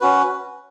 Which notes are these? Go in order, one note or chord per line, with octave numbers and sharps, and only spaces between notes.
C#4 F#4 B4